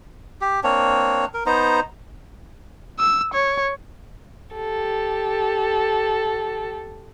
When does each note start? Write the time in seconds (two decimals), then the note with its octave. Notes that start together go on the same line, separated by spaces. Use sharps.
0.41 G4
0.64 A#3 C4 D4 C#5
1.34 A#4
1.46 B3 D#4 C5 A#5
3.00 E6
3.34 C#5
4.55 G4 A4